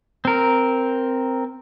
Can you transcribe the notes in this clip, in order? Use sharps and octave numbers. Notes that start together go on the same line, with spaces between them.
C4 A#4